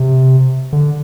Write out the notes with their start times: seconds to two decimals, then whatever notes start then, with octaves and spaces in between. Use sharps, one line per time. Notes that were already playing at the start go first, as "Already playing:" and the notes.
Already playing: C3
0.73 D3